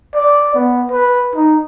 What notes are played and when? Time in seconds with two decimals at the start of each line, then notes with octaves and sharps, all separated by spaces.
0.15 D5
0.54 B3
0.91 B4
1.35 D#4